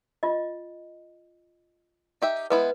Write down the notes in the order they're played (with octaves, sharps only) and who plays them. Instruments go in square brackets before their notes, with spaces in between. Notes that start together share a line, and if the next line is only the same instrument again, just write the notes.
[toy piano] F4 D#5
[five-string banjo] D#4 G4 E5
[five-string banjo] G#3 B3 E4 [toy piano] B4